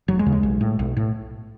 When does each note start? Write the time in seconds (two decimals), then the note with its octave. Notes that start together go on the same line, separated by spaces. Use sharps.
0.08 F1 F#3
0.19 G#3
0.26 D#2 C#3
0.32 G#3
0.43 B1
0.61 A2
0.79 B1
0.97 A2